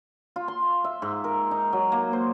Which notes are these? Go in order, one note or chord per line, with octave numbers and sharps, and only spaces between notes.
F4
C6
E5
G#2
A#4
D#4
F#3
A#3
C5